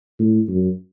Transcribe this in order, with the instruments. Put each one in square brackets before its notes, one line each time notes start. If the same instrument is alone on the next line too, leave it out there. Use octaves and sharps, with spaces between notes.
[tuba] A2
F#2